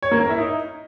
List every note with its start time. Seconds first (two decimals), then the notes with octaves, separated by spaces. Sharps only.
0.02 C#5
0.11 A#3
0.20 A#4
0.29 E4
0.38 D#4